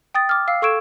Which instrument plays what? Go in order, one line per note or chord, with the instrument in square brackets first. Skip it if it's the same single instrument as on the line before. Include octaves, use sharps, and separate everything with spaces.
[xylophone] G5 D#6 A6
D6 F6
F5 E6 C7
A4 C#6 E6 G#6 D7 E7